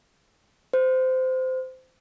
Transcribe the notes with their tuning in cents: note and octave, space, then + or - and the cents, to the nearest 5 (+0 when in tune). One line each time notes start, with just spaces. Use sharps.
C5 -20